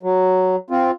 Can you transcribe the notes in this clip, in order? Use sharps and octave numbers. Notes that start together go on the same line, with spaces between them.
F#3
C4 F4